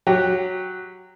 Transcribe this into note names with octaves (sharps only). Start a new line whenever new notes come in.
F#3 G4